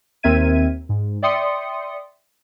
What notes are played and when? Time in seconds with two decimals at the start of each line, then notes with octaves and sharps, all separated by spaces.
0.23 D#2 C4 A#4 E5 G#6 D#7
0.89 G#2
1.22 D5 E5 G5 C6 D#6 C#7